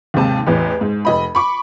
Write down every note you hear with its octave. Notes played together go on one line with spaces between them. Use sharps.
D#2 G#2 C3 A5
A1 E2
G#2
F1 D#5 B5
B5 C#6 D6